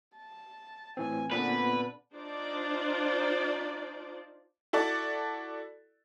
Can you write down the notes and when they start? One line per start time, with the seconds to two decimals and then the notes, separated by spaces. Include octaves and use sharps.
0.17 A5
0.97 A2 E3 C4 G#5
1.32 A#2 D3 B3 C4 B4
2.14 D4 D#4 F4 C5 D5
4.73 E4 F#4 A4 D5